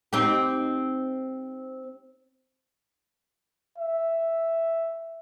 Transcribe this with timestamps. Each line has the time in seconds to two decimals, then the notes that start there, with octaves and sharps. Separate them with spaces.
0.13 C4 D#4 G4
3.78 E5